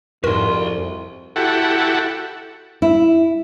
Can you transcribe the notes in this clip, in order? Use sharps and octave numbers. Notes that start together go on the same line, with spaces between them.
C2 F2 G#2 F#4 A#4 C6
E4 F#4 G4 A4 F#5
E4